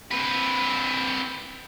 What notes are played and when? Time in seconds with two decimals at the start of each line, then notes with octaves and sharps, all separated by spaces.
0.11 C4 B4